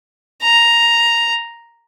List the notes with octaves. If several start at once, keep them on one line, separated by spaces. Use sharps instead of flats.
A#5